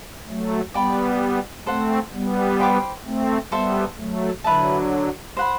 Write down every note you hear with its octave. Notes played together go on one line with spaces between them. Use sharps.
F#3 A3
G3 B3 D5 G5 B5
A3 C4 A4 C5 F#5
G3 B3
C5 G5 B5 D6
A3 C4
G3 B3 A4 C5 E5
F#3 A3
D3 F#3 E4 B4 E5 A5
C5 F#5 B5